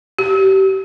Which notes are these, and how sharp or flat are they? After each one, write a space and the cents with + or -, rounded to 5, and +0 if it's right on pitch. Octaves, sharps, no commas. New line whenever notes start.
G4 -30